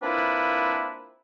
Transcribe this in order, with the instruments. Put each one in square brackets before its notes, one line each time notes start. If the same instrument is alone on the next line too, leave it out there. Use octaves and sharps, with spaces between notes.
[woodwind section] A#3 C4 D4 E4 F4 B4